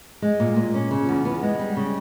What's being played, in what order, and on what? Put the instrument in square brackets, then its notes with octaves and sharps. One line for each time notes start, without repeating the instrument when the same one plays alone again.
[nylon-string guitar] G#3
A#2
A#2
C#4
C#3
E2
B3
G#3
G3
C#3